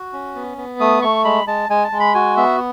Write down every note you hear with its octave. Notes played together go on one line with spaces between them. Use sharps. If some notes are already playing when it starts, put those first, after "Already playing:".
Already playing: F#4
C#4
B3
B3
A3 D#6
A3 C#6
G#3 B5
G#3 A5
G#3 G#5
A5
G#3
B5
F#4 G#5
B3 E5